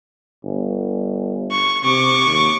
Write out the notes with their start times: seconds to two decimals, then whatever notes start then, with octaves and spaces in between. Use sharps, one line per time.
0.44 G1
1.52 C#6
1.84 C3 C#6 D6
2.27 D#2